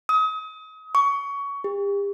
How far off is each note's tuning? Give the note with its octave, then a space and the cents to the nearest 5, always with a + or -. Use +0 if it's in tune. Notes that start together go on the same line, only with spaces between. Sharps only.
D#6 +35
C#6 +20
G4 +40